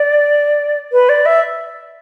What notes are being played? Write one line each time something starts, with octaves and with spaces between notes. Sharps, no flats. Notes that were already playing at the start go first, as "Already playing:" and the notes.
Already playing: D5
B4
D5
E5